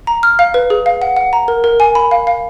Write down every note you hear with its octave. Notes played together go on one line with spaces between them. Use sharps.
A#5
F6
F5
B4
G#4
F5
F#5
F#5
A#5
A#4
A#4
G#5
B5
F5
F5